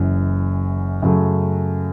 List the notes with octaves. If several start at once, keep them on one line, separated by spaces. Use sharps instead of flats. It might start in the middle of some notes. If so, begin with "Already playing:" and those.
Already playing: F#1 F#2 E3
F#2 C#3 F#3 A3